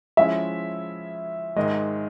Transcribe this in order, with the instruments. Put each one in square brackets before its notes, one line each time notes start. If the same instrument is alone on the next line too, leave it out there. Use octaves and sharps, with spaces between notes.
[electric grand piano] F3 G#3 C#4 E4 [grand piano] E5
[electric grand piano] G#2 D#3 G#3 [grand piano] D#5